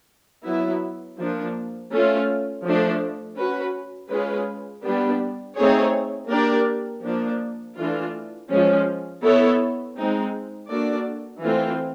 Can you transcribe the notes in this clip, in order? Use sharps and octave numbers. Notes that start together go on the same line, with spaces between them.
F#3 B3 E4
F3 A#3 D4
A3 C#4 F4
F3 A3 D4
C#4 F#4 B4
G#3 C#4 F4 G#4 B4
G3 B3 D4 G4
A3 C4 D#4 G#4 C#5
A#3 D4 G4 A#4 D5
F3 A#3 D4
E3 A3 D4 F4
F3 G#3 C#4
B3 E4 A4 C#5
G#3 C4 D#4
A#3 D4 F#4 A4 D5
E3 A3 C4 F4